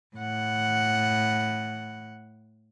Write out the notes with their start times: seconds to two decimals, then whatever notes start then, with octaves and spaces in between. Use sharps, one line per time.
0.16 A2 F#5